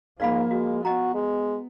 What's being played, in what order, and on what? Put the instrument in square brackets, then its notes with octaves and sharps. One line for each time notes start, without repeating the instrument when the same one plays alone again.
[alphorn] G#2 [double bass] F3 A#3 [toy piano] D5 F5 B5
[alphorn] G#3 [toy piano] F#4
[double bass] B3 [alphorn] F#4 [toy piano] D#5 G5 A#5
[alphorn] G#3